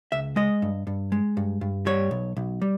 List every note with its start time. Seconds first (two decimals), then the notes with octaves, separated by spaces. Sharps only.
0.12 C#2 E5
0.36 G#3 D#5
0.62 G2
0.87 G2
1.12 G#3
1.37 G2
1.61 G2
1.86 G3 C#5
2.11 B1
2.37 B1
2.62 G3